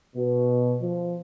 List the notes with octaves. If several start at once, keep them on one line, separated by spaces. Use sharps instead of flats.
B2
F3